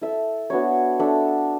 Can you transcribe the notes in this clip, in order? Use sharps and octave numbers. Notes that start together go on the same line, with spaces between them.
E4 A4 E5
B3 D4 F#4 C#5
D4 A4 E5